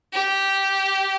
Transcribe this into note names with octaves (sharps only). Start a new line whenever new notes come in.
G4